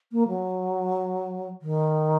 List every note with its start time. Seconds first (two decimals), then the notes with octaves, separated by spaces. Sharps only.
0.12 A#3
0.28 F#3
1.61 D#3